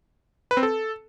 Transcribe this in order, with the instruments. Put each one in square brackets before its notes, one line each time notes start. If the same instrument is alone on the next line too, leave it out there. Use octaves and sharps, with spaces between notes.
[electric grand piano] B4
C4
A4